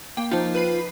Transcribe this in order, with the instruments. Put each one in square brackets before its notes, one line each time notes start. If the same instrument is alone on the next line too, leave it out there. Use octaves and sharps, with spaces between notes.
[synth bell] A#3 G5
[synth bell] F3 D#4 [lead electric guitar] F4
[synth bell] B4 B5 C7